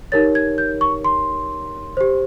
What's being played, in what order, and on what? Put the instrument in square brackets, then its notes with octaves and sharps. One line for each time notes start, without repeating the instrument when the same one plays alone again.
[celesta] D#4 G4 A#4 C#5 A6
G#6
G6
C#6
C6
G4 C5